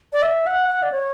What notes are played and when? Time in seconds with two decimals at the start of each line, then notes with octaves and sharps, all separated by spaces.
0.13 D5
0.22 E5
0.46 F#5
0.69 F#5
0.83 D5
0.92 C#5